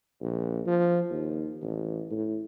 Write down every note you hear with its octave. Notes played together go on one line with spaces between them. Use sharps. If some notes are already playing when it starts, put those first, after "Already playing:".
A#1
F3
D#2
A1
A2